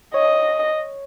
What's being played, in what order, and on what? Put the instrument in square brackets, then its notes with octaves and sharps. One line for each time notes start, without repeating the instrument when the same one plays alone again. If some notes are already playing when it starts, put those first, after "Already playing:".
[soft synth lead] C#5 [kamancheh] D#5